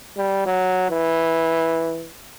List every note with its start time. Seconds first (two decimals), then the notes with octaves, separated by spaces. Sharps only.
0.17 G3
0.46 F#3
0.90 E3